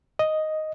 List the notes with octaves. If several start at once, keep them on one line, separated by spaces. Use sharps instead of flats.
D#5